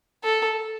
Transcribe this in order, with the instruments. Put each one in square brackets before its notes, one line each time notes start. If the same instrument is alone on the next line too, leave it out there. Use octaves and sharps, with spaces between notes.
[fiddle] A4